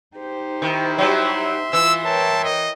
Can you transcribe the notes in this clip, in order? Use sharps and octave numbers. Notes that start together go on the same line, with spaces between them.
D#4 G4 C5
D#3 E4
F#3 G3 E5 C6
E3 F4 E6
A#4 C#5 G5 A5
D#5